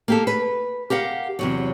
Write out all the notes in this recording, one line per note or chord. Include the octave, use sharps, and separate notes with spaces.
A#3 G4 A4
B4
G4 A#4 F5 F#5
E2 C3 F#3